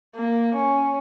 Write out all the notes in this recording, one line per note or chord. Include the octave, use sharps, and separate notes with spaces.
A#3
C#4